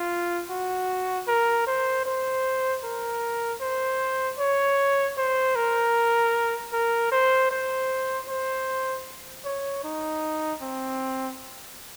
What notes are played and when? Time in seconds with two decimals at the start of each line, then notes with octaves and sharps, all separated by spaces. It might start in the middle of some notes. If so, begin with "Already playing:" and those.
Already playing: F4
0.50 F#4
1.28 A#4
1.67 C5
2.05 C5
2.83 A#4
3.61 C5
4.39 C#5
5.17 C5
5.56 A#4
6.73 A#4
7.12 C5
7.51 C5
8.28 C5
9.45 C#5
9.84 D#4
10.62 C4